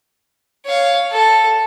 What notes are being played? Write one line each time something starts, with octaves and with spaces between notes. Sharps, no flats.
C#5 F5
A4